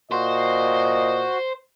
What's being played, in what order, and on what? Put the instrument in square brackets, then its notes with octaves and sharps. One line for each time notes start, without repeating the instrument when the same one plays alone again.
[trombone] A#2 [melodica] F#4 [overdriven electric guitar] C5 [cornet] D#5